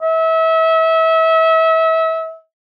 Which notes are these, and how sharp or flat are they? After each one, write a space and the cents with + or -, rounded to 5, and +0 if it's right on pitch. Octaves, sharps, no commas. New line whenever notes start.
E5 -30